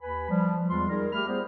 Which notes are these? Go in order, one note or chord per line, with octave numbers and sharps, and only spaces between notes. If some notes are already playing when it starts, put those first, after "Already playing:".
D#2 B4 G#5 B5
F3 G3
E2 G3 G#3 F4 C6
G3 D#4 G#4 A#4
A3 G4 B5 F6
G3 B3 F4 G#4 C5